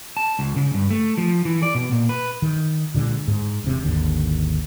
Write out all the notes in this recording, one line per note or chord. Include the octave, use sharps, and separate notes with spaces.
A5
C#2
C#3
G2
A3
F3
E3
D5
B2
A#2
B4
D#3
A#2 D3 D#3 G#3
G#2
E1 C3
G#1 D#2 D3